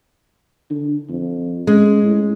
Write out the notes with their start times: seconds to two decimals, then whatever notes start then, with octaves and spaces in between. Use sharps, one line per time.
0.70 D3
1.09 F2
1.67 G#3 C#4
2.04 A2